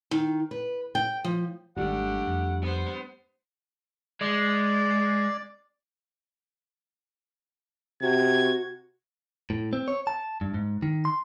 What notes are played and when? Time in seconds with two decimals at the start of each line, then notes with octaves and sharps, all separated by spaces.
0.11 D#3
0.51 B4
0.95 G5
1.24 F3
1.76 G#1 D#3 G3 A3 D4 G4 F#5
2.27 F2
2.61 B3 C5
4.21 G#3 D5
8.02 C3 F#4 G#6
9.50 A2
9.73 C4
9.88 C#5
10.07 A5
10.41 G2
10.54 G#2
10.82 D#3
11.05 C6